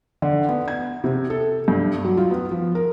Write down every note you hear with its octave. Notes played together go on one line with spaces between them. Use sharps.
D3
B3
G#6
C3
A4
G2
F#3
F4
B3
F3
A#4